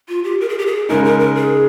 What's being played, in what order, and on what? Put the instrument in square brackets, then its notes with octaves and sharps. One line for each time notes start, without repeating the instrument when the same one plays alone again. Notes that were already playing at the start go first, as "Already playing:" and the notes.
[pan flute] F4
G4
A#4
G#4
G4
G#4
[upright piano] C#3 G#3 D#4 [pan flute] A#4
[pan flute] A#4
A#4
G#4